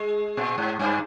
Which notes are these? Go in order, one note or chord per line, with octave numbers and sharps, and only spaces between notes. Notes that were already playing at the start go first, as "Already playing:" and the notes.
Already playing: G#3
A#2
G#2
G2